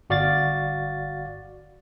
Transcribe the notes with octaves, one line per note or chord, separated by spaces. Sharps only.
G1 F#4 D5 F5 A6